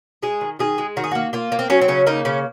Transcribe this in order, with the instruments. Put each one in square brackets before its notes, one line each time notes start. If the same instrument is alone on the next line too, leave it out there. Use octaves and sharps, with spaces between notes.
[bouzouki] G#3 G#4
D#3
D#3 G#4
G#3
D#3 F#4
G#4
A#3 F#4
A#3 F4
A#3
C4
F#3 C#4
C4
C#3 C#4
A#3 D#4
C#3 C#4